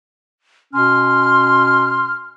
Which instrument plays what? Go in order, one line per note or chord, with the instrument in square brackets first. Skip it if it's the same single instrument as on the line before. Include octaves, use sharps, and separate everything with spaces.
[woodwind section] B2 C#4 F6 [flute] C6